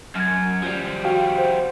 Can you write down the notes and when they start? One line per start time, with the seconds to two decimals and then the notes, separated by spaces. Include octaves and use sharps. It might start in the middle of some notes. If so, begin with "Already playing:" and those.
0.16 F#2 F6 G#6
0.63 F3 G3
1.05 F#4 F5 G5
1.38 C5 F#5